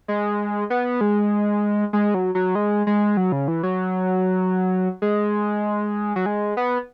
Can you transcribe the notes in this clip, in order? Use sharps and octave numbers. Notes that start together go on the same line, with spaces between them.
G#3
B3
G#3
G#3
F#3
F#3
G#3
G#3
F#3
C#3
E3
F#3
G#3
F#3
G#3
B3